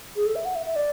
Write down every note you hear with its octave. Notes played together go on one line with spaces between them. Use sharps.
G#4
A4
E5
F#5
E5
E5
D5